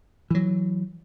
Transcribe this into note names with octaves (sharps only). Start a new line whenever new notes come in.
E3 F#3